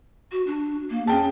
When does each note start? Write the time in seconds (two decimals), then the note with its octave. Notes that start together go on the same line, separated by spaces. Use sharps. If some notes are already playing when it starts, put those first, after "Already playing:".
0.32 F#4
0.47 D4
0.90 A#3
1.07 C#4 G#4 G5 A5